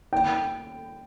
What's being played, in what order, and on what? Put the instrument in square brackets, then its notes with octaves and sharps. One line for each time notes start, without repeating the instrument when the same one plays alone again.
[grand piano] G5